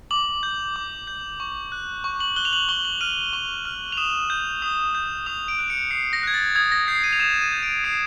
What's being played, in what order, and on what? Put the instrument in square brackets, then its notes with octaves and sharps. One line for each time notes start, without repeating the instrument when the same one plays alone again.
[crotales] D6 F#7
G6
D6
G6
C#6
F#6
C#6
F#7
F#6 G7
F7
F#7
C#6 G7
F#7
F6 D#7
C#6 F7
F6
F7
D#6 E7
G6
D#6
G6
D#6 F7
D7
F#6
C#7
D#6 C7
A#6
F#6 G#6
A6
D#6 G#6
A#6
G6 C7
D#7
F7
D#6 E7
D#7
G6
D7
D#6 C7